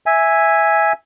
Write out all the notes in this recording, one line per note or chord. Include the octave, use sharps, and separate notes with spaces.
E5 G#5